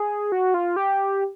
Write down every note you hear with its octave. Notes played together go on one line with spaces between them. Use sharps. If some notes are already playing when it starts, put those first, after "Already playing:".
Already playing: G#4
F#4
F4
G4